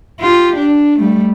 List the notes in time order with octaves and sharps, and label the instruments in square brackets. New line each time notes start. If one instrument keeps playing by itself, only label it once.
[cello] F4 G4
D4
G3 A3